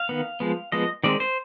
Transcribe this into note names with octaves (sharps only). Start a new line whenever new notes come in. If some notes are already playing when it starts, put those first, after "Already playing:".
Already playing: F5
D#3 B3
F3 G#3 B3
F3 G#3 B3 D#5
D#3 G#3 C4 D5
C5